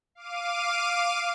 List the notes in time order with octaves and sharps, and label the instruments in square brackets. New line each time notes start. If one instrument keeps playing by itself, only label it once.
[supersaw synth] F5 D6 D#7